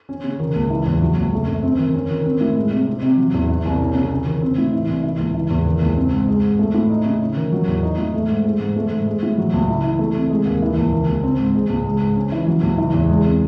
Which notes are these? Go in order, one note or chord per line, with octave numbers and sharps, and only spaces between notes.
C#4
C#3
D#3
C#2
E3
E2
F#3
C#2
A3
F#2
C4
D#3
C#4
D#3
C4
A2
G#3
C3
C4
C3
F#3
E2
E3
C2
C#4
C#3
C#4
D#3
C4
A2
E3
C2
E3
C#2
E3
E2
D#3
C#2
C4
G#2
G#3
G#2
A3
A2
D#4
C#3
C#4
D#3
F#3
E2
D#4
A2
A3
G#2
G#3
G#2
A3
G#2
G#3
A2
F#3
C#2
E4
E3
A3
C3
G#3
D#2
E3
C#2
D#3
C#2
C4
G#2
G#3
C#2
G#3
G#2
C#4
E3
F#3
C#2
E3
E2
G#3
C3